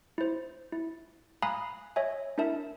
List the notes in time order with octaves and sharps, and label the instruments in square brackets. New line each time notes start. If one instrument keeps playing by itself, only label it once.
[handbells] E4 C5
E4
F5 G#5 A#5 B5 D#6 F#6
C#5 D#5 E5 G#5
D4 E4 A#4 E5 A5